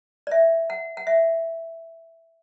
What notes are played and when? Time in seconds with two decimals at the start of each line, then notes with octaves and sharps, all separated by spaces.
0.27 D5
0.31 E5
0.70 F#5
0.97 F#5
1.07 E5